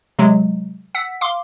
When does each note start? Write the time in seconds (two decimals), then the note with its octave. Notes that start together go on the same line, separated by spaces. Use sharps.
0.19 C3 F#3 G#3
0.95 F#5 E6 B6
1.21 F5 C6 D6